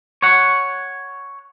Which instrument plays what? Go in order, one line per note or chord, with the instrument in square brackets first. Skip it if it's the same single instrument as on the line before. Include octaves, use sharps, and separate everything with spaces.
[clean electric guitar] C#5 F#5